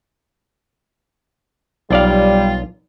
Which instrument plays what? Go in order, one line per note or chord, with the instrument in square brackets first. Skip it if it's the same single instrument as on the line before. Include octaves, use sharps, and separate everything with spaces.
[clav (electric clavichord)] B1 D5 F5 [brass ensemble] G3 [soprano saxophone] F4